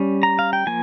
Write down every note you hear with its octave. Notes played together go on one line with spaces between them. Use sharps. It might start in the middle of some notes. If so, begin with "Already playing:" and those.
Already playing: G3 C#4
A#5
F5
G5
F3 A#3 G#5